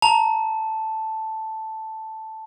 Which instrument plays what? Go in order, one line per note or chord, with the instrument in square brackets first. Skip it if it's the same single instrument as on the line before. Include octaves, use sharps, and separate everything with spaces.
[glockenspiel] A5 [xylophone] A#5